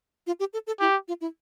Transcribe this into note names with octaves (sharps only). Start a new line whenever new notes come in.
F4
G4
A4
A4
E4 G4
F4
E4